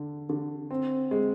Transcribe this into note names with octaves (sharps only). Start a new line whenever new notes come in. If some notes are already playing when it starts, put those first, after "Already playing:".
Already playing: D3
D3
C4
G#3